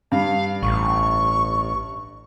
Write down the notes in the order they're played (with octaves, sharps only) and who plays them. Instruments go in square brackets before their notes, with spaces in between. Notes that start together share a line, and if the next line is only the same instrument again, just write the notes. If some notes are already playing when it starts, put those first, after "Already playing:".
[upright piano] G2 [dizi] F5
[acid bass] A1 [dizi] C#6